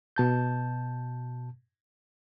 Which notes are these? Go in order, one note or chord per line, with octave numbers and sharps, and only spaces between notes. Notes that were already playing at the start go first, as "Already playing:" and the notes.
B2 A5 G6